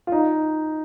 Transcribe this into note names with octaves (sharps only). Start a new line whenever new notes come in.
F4
D#4